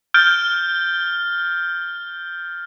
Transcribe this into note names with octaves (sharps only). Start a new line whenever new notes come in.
F6 G6 A6 D7 G7